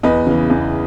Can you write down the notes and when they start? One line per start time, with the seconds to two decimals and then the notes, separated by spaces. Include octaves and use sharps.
0.03 E2 B4 D#5
0.27 C#3 E3
0.50 E2